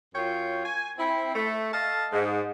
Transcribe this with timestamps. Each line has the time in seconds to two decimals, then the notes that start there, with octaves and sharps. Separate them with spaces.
0.15 F#2 F4 C#5 G5
0.66 G#5
0.98 C4 E4
1.35 A3
1.73 A4 D#5 F5 A5
2.13 G#2